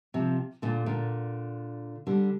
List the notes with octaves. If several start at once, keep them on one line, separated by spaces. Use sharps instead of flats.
C3 F3
A#2 D3
A#2 D3
D3 G3